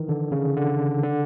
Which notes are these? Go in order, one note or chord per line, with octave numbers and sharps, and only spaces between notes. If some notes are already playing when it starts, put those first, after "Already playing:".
Already playing: D#3 E3
D3
C#3
D3
D3